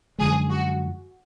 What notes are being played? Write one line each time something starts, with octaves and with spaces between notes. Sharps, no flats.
F#2 D3 F3 G#3 G#4
F#4